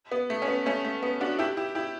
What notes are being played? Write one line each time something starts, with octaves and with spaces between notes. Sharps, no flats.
B3
A3
C#4
B3
A3 C#4
A3
B3
D4 F#4
E4 G4
E4 G4
E4 G4